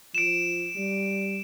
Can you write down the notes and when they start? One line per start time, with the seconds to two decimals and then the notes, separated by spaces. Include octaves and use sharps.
0.15 F3 D7 E7
0.76 G3